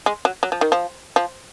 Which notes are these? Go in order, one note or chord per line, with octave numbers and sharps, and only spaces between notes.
G#3
F#3
F#3
F3
D#3
F3
F3